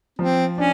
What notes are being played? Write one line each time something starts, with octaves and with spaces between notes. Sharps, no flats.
F3 C4
C#4 D4